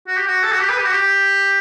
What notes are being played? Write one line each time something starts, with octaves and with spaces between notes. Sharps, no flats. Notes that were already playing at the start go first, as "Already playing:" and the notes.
F#4
G4
F#4
A4
F#4
G4
B4
G4
F#4
G4